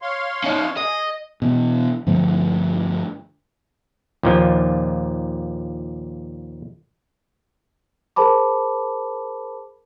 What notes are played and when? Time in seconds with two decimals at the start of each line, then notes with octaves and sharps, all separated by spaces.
0.02 C#5 F5 C6
0.44 C#4 D#4
0.77 G#4 D#5
1.42 B2 E3
2.07 G2 D3 F3 A3
4.23 D#2 A#2 F3
8.16 G#4 A#4 C5 A5 B5 D6